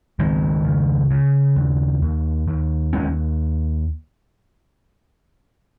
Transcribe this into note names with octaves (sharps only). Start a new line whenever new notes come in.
C#2 D#3 G#3
C#3
C#3
D#2
D#2
D#2
D#2 G#3 C#4